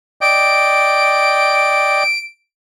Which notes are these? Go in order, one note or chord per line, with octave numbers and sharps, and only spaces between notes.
D5 D#5 G5 D7